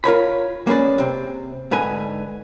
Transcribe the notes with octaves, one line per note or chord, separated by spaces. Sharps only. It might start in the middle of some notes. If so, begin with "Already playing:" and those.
F4 A#4 C#5 B5
A#3 C#4 G#4 B4 D5
C3 C4
G#2 D3 B4 G#5